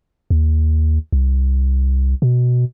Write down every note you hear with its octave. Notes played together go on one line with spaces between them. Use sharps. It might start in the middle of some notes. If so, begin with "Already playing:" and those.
D#2
C2
B2